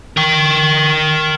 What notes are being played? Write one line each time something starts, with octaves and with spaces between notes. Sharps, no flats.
A#4 G5